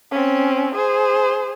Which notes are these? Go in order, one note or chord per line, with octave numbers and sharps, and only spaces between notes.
C4 C#4
G#4 C5